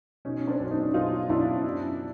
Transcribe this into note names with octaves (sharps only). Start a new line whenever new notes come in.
B2 C#4 D#4
C4 D4
B1
C#4 D#4
B1 D#4 F4
B1 D4 E4
F#2